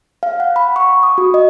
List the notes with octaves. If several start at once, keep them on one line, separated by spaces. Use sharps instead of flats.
F5
F#5
B5
C#6
D#6
F#4
D#5